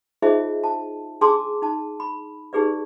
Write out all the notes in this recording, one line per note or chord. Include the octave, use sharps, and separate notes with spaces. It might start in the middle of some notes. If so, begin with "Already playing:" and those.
D#4 F4 G#4 C5 D#5 E5
A5
D4 G#4 A5 C6 D6 E6
D#4 A5
B5
D#4 G4 G#4 B4 D5